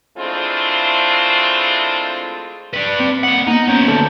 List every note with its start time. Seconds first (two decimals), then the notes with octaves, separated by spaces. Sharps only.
0.17 E3 G#3 A3 C4 D4 F4
2.73 D4 B4
2.99 C4
3.23 A#3 D#5 F#5
3.47 A#3 B3 D#4
3.68 F#3 C#4 C5
3.88 D2 D3 A4